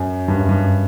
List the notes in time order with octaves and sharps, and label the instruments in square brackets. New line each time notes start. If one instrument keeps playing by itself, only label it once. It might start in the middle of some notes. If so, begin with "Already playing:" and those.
Already playing: [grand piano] F#2
G2
F#2
G2